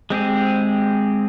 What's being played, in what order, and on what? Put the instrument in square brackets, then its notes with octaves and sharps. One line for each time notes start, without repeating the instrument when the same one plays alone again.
[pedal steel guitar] G#3 C4 G4 G#4